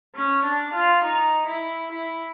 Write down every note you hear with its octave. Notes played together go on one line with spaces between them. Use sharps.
C#4
D4
F4
D#4
E4
E4